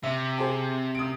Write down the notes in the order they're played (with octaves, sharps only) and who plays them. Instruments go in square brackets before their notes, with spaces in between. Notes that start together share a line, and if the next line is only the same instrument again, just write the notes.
[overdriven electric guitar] C3 [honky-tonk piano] E5
[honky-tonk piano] G#4 C5 A5
D#6 D7